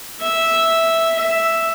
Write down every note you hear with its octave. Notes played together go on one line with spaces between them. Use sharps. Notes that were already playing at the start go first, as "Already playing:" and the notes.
E5
E5